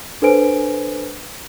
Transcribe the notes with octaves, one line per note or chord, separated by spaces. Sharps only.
D4 A4 B4 C5 G#5 D7